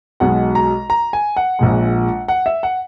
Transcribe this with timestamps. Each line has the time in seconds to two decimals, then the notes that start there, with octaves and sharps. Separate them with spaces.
0.20 B1 B2 G#3 F#5
0.55 A#5
0.90 A#5
1.13 G#5
1.37 F#5
1.59 A#1 A#2 G#3
2.28 F#5
2.46 E5
2.63 F#5